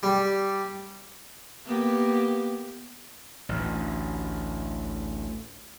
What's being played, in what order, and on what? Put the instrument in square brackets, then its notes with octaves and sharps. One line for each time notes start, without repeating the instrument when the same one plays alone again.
[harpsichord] G3
[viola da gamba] A#3 B3 G4
[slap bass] A1 D2